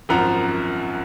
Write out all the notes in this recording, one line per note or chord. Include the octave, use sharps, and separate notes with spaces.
G#1 F#2 F3 F#5 A#5